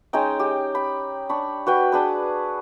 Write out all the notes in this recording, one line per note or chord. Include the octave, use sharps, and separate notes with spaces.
G#3 C#4 D#4 G5
G4
B5
D4 B5 C#6
F#4 B4 G5
D4 G#4 B4